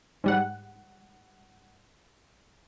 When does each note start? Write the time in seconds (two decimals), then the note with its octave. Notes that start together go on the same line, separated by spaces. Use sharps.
0.24 G#2 G3 F#5